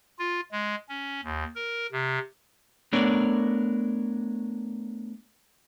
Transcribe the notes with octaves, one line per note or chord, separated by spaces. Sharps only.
F4
G#3
C#4
D#2
A#4
C3
A3 B3 D4 A#4 C#5 D5